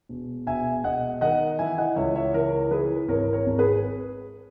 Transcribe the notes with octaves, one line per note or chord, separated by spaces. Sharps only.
E1
E1 E5 G#5
E1 D#5 F#5
D#3 D#5 F#5
E3 E5 G#5
D#5 F#5
C#2 C#5 E5
C#5 E5
E3 A#4 C#5
E3 G#4 B4
G#1 A#4 C#5
A#4 C#5
G#1
G#4 B4